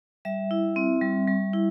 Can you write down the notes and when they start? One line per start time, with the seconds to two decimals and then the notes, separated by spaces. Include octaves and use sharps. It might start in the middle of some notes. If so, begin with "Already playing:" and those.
0.25 G3 E5
0.51 E4
0.76 C4
1.01 G3
1.28 G3
1.53 E4